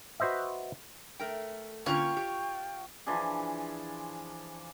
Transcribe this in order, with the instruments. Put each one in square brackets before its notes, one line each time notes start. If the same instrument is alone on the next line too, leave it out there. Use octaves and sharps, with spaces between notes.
[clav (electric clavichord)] F#4 B4 C5 D#5 E5
[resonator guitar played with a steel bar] A3 A#4 G5
[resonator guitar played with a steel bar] D3 A#3 C#4 [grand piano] F4 F7 [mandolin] C#5 [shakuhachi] G5
[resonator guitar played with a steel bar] G4
[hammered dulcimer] E3 F3 D4 G#4